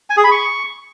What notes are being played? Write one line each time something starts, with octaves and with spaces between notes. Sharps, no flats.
G#5
G#4
B5
C#6